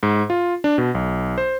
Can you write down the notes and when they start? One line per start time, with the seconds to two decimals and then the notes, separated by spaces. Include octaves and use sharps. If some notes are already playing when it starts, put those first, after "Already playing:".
0.03 G#2
0.30 F4
0.64 D4
0.78 B2
0.95 B1
1.38 C5